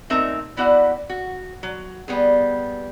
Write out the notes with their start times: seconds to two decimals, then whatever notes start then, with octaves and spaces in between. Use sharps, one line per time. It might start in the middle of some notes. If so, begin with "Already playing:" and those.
0.10 A#2 A3 C4 D#4 A#4 E5
0.57 G3 B3 E4 F#4 D5 F#5
1.09 F#4
1.63 F#3
2.08 G3 B3 G#4